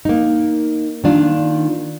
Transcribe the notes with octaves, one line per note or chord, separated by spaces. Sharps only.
A#3 D#4
D#3 A#3 D4 F4